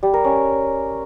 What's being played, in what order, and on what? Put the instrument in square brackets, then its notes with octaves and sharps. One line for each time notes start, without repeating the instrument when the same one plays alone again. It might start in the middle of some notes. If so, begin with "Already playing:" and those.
[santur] G3
A#4
C#4